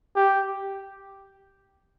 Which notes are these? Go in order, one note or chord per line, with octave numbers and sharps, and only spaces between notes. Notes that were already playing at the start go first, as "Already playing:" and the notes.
G4